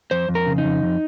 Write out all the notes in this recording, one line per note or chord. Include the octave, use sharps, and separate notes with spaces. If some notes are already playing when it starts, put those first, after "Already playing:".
F2 C5
F2
A#4
C#3
D#4
F2
F2